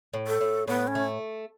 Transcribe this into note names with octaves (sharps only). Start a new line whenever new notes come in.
A2
A4
A2
A2 B3
C#4
A3